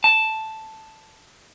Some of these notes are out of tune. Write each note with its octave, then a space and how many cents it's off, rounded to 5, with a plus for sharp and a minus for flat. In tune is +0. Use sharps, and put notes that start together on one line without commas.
A5 +0